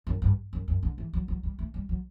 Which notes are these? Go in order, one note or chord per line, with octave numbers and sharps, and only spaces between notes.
F#2
G2
F#2
F#2
D3
E3
F#3
F#3
G3
A3
G3
F#3